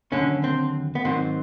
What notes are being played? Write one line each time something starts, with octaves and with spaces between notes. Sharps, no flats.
D#2 D3 F#3 C#4
C4
B3
G#2 D#3 F#3 C4